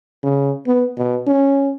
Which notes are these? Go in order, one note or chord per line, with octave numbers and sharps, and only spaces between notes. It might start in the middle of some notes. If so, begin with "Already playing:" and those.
C#3
B3
B2
C#4